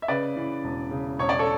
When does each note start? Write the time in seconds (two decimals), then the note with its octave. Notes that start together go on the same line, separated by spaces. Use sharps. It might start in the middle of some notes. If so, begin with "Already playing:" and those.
0.02 E5
0.08 C#3 B4 D5
0.36 E3
0.64 E1
0.91 C#3
1.19 E1 C#5
1.29 D5
1.39 A4 C#5